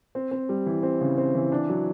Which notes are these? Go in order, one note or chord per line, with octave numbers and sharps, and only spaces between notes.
C4
C4
G3
E3
C4
C#3
C4
E3
D4
F#3